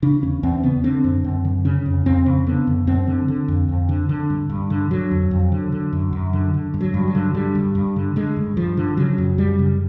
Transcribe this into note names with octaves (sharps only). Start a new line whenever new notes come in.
C#3 D4
E2 C#4
E2 C4
C#3 B3
D3 C4
F#2
F#2
D3
C#3 C#4
F2
F2 C4
C#3
D3 B3
F#2
F#2 C4
D3
D3
F2
F2
D3
D3
G2
G2
D3
D3 F#3
F2
F2
D3
D3
F#2
F#2
D3
D3
G2
F#3
G2
F#3
D3
D3 G3
G2
G2
D3
D3 G#3
G2
G2 F3
D3
C#3 F#3
F#2
F#2 G3
C#3